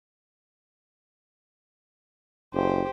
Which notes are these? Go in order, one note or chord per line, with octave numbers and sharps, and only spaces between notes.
F#1 G4 C5